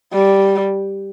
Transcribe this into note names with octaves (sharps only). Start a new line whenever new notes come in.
G3